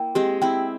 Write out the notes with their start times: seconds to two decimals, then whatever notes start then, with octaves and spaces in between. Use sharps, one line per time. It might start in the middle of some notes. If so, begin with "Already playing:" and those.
Already playing: A#3 E4 G5
0.15 G#3 C4 G4
0.42 C4 E4 G5